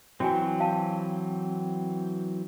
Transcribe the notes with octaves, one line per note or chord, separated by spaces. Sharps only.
E3 F#3 C4 F#4 G5 G#5
F5 A5